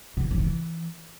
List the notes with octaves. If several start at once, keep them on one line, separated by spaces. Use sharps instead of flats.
B2
D3
F3
D#3
E3